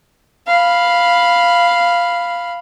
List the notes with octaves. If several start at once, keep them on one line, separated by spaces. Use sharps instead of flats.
F5 B5